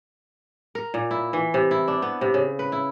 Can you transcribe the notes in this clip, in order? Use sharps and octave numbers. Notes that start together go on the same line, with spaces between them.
A#4
A#2
E4
E3
C3
E4
D4
B3
C3
C#3
B4
E4